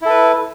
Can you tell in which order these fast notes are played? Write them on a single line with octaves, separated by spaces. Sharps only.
E4 A4 B4